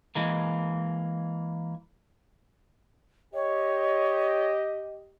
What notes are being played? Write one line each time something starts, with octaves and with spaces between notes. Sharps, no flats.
E3 G#3 A#3
G4 C#5 D#5